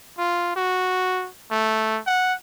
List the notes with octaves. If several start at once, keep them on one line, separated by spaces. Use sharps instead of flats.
F4
F#4
A3
F#5